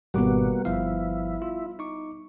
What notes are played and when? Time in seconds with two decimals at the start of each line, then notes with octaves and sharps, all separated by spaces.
0.14 G#1 B2 G3 A#3 B3 F#4 D6
0.65 G1 F3 E4 F5
1.42 F4
1.79 D#4 C#6 D6